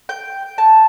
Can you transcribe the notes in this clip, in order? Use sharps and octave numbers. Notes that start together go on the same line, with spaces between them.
G5
A5